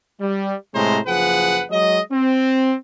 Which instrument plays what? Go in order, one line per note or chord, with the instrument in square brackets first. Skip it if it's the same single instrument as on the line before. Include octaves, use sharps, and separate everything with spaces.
[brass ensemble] G3
A2 C3 G#3 C5 A#5
F#1 F3 G#4 B4 F#5
F#3 G#3 D#5
C4